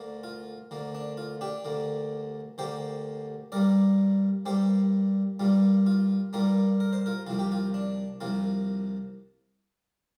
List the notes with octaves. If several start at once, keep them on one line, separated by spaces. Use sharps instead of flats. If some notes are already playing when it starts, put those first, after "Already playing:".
Already playing: D2 D3 A#3
F4
D2 D3 A#3
D4
F4
D4 G4
D2 D3 A#3
D2 D3 A#3 G4 C5
G2 G3 A#3 A#4 D5
G2 G3 A#3 G4 C5
G2 G3 A#3 F4
F4
G2 G3 A#3 F4 A#4
A#4
C5
F4 A#4
C2 C3 F3 A#3 F4
G4
F4
D4
C2 C3 F3 A#3 F4